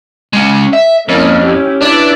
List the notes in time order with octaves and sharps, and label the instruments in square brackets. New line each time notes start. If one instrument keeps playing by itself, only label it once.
[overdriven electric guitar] G#3 C#4
E5
[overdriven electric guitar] F2 [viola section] A#3 C#4 E4
[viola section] C#4 E4 G4
[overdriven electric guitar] D4 [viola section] E4 B4 D5